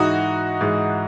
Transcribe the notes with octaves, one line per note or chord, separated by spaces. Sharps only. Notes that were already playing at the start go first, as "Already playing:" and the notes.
Already playing: G#2 E3 D#4 F#4
G#2 E3